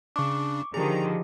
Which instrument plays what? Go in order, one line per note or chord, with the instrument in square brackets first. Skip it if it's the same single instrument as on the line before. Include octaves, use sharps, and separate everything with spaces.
[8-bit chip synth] C#3 D4 [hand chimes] C#6 D6
[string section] D3 D#3 F3 [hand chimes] G4 G#4 [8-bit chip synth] A#5